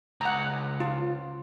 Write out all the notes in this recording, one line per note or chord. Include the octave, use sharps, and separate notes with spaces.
C#2 F#5 A#5
F4